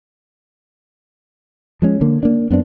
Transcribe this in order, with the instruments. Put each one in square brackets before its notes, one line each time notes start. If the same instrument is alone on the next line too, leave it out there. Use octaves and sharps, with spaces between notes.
[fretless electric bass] F3 G#3 C#4
D3 A#3
A#3 D4
F#2 B3 C4 D4